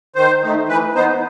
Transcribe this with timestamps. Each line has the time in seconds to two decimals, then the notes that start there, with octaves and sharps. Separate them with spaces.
0.15 D#3 C5
0.42 A3 D#4
0.68 E3 B4
0.95 B3 D#4 C5